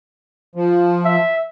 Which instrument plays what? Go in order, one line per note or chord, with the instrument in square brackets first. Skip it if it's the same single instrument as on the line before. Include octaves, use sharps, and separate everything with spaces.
[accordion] F3
[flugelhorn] E5